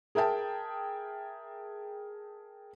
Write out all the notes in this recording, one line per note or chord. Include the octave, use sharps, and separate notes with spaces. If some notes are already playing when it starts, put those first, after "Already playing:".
G#4 A#4 E5 G5 A5